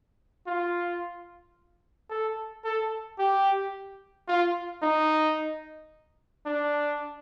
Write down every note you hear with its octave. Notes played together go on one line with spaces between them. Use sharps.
F4
A4
A4
G4
F4
D#4
D4